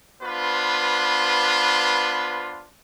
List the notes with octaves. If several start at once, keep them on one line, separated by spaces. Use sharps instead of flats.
B3 D4 F4 B4 C5